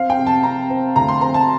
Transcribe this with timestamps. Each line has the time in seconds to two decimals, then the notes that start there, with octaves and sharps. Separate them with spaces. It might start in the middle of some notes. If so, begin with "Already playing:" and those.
Already playing: C4 F5
0.10 G5
0.18 C3
0.27 A5
0.43 C3 A#5
0.70 C4
0.96 D2 A#5
1.08 C6
1.21 C4 A#5
1.34 A5